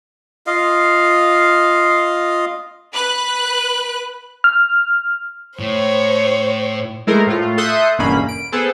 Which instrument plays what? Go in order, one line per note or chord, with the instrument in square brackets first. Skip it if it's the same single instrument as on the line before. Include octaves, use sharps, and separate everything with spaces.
[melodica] F4 D#5 F5
[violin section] B4 F#6
[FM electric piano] F6
[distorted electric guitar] A2 [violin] C5 C#5
[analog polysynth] G#3 A3 E4 A#4 C5
A2 A3 F4
A4 E5 C6 D#6 F#6 G6
G1 E2 B2 A#3 C#4 B5
D7
B3 G#4 A4 C5